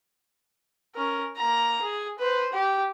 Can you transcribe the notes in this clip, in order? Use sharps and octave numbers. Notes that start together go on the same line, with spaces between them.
C#4 A#4
A#3 A#5
G#4
B4 C5
G4